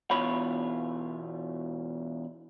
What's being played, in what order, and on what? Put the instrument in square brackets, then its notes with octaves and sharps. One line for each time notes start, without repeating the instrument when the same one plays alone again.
[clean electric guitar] E2 B2 E3 F4 C#5 B5